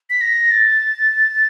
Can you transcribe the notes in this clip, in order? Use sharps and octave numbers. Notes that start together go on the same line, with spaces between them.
B6
A#6
A6